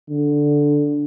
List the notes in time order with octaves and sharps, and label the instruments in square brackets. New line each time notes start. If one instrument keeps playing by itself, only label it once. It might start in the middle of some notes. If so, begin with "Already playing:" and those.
[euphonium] D3